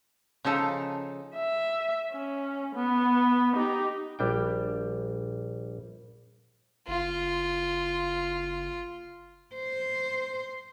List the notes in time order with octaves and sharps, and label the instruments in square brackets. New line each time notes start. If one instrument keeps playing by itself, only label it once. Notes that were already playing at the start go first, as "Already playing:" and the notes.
[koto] C#3 F3 D#4 A4
[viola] E5
C#4
B3
D#4 G4
[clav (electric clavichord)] A#1 G3 D4 G5
[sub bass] F#1 [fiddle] F4
[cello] C5